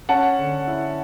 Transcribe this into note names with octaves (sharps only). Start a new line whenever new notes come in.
C#4 F#5 A5
D3
E4